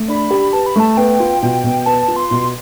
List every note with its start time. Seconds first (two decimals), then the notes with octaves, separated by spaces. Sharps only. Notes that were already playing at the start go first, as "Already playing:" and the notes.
Already playing: A3
0.08 D4 B5
0.30 G4
0.53 B4 A5
0.66 B5
0.76 A3 A5
0.97 B3 G5
1.20 F4
1.42 B2 G5
1.64 B2
1.86 B3 A5
2.08 F4
2.16 C6
2.31 B2